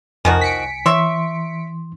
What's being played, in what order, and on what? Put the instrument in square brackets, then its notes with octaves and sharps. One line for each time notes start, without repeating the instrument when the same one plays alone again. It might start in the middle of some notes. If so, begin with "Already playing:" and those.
[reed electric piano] C2 G#5 [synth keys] F2 A#4 [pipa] D#3 F3 F#4
[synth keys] B6 C#7 D7
[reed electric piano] E3 C6 [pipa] C#5 E5